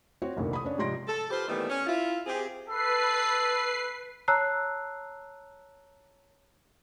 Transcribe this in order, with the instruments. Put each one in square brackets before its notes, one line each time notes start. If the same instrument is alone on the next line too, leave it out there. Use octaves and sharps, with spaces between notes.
[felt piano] C4 F#4 C#5
F1 C2 G2 A#2 D3 D#3
B5 D#6
C#4 D4 C#5
G#2 C3 F3 C6 A#6 D7
[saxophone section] A4
F4 G4 B4 C5
A#2 D#3 E3 G3 A3 B3
C#4
E4 F4
C4 G4 G#4
[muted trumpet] A4 [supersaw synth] B4 C7
[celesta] C#5 A5 A#5 E6 F#6 C7